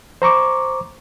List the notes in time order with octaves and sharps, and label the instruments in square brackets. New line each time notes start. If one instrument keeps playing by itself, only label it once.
[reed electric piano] C5 A#5 C#6 D6